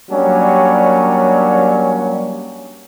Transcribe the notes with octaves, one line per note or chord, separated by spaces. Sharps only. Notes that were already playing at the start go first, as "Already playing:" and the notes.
F#3 G3 A#3 C#4 D4